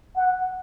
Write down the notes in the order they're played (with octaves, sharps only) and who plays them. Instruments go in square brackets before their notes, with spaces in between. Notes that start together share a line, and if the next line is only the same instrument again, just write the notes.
[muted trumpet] F#5